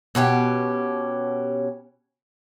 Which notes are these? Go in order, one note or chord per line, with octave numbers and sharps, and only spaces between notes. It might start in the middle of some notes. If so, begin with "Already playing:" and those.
B2 C#4 F#4 G4